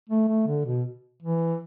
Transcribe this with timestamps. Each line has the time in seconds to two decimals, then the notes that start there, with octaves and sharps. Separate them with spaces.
0.09 A3
0.28 A3
0.47 D3
0.66 B2
1.22 E3